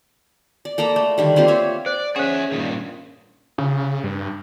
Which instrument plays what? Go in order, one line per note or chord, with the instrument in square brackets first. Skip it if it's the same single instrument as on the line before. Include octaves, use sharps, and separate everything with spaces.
[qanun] D5
A#3 A4 A#5 B5
A3
D3 D#3 G3
A#3 C4 F4 G4
C#5 E5 F5
[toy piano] C5 [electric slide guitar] D5
[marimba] C#4 C#5 [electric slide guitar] G#4 E5 [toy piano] C5 F#5
[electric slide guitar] G2 A#2 D#3
[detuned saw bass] C#3
G2